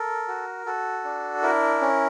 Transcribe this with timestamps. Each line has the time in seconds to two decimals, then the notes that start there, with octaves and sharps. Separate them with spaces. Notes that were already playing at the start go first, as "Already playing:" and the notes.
Already playing: A4 A#4
0.28 F#4
0.66 F#4 A4
1.04 D4
1.42 E4 A#4
1.81 C#4